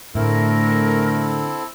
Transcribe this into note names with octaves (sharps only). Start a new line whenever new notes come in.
A2 D3 A3 C4 E4 A4 A#4